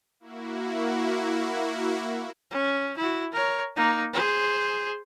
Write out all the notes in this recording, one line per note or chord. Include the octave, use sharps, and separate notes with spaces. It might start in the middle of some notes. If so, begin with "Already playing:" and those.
A#3 E4 F#4
C#4
E4 F#4
A#4 C#5
A#3 D#4
G#4 C5